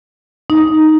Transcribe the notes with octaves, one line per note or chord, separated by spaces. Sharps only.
D#4